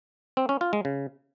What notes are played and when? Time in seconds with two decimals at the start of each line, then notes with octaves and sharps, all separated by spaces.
0.37 C4
0.49 C#4
0.61 F4
0.73 G#3
0.85 C#3